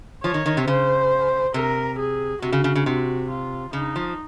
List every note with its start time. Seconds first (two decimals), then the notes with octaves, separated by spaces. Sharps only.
0.23 F3 C#5
0.34 D#3
0.46 D#3
0.57 C3
0.68 C#3 C5
1.54 C3 A#4
1.99 G#4
2.42 C3 F#4
2.52 C#3
2.64 C#3
2.75 C#3
2.86 C3 F#4
3.30 F4
3.73 C#3 D#4
3.96 F3